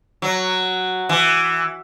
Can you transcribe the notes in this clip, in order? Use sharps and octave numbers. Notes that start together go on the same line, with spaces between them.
F#3
E3